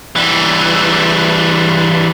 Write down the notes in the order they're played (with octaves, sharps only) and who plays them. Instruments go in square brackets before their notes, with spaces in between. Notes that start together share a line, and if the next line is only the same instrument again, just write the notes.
[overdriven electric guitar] E3 G3